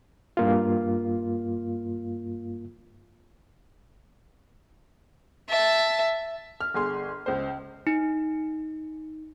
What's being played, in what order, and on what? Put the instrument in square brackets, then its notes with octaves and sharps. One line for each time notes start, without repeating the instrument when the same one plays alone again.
[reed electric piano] G2 A#3 F4
[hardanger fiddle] E5 A5
[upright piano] F6
G1 G#4 C6
C#2 C5
[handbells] D#4